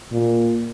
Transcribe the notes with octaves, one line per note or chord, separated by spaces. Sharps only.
A#2